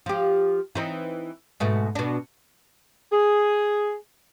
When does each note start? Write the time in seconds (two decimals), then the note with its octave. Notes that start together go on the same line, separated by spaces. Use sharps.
0.06 F3 G4
0.75 E3 C4 D#4
1.60 G#2 B2 A3
1.95 B2 D4
3.12 G#4